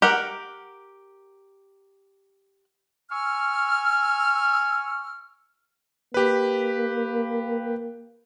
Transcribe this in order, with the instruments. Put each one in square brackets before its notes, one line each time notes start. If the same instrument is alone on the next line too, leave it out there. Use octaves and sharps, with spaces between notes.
[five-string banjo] G4 A#4 F#5
[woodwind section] G#5 C#6 E6 F6
[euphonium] A#3 [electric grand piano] G4 B4